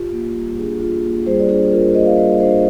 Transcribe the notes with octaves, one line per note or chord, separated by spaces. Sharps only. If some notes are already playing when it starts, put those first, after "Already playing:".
Already playing: F4 G4
A#3
G3
D4 G#4
F4
A#3
G3 G#4 C5
D5
D4 G#4 C5
F4 A#4 D5
A#3 C5 D#5
F5
G3 C5 D#5
D4 C5 D#5